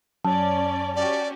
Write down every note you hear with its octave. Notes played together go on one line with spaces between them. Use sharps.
F#2 C#4 D5 A5
C#4 F#4 G4 D5